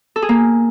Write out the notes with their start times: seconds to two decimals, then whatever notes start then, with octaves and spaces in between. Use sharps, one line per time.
0.16 A4
0.22 G#4
0.29 A#3